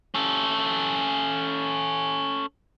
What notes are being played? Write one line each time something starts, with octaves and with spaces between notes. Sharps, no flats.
C#4 A4